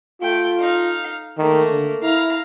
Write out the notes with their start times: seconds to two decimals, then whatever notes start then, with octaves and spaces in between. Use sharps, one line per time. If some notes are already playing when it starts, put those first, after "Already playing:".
0.21 A3 F4 G5
0.59 D#4 F5
1.38 D#3 A3 A#3
1.70 D3
2.03 E4 F5 A#5